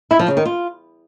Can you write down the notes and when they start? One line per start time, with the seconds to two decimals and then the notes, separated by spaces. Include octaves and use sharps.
0.11 E4
0.19 F3
0.28 C#3
0.37 D#3
0.45 F4